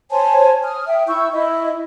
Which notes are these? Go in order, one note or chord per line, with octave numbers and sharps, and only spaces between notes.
C5 C#5 G#5 A5
D#6 F6
E5 G5
E4 C#6 E6 G6
E4 D#5 E5